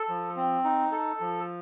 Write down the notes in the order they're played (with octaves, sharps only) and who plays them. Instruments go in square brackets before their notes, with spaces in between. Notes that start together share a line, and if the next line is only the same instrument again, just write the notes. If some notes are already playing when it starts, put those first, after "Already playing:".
Already playing: [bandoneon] A4
F3
C4
D#4
A4
F3